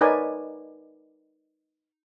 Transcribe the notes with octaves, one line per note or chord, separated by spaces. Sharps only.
D#4 A#4 B4 C#5 D5 G#5